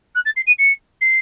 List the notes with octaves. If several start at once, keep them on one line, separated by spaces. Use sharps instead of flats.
F#6
A6
C7
D#7
C#7
C7